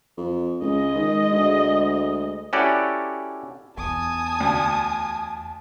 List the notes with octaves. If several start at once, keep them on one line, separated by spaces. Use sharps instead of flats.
F2
C#2 G#3 D#5
D#3
D2
C#4 E4 F#4 G4 A4 D5
E2 B3 G#5 A5 D#6
D2